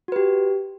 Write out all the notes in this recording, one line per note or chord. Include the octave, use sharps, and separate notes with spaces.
F#4 G4 B4